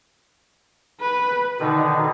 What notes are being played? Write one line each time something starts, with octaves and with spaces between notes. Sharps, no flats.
B4
B2 D3 D#3 D#4